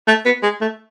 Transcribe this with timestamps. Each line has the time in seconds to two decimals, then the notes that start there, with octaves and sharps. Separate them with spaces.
0.08 A3
0.25 B3
0.43 G#3
0.61 A3